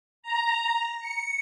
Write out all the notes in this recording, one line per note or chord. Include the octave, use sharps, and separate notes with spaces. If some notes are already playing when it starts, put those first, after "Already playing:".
A#5
C#7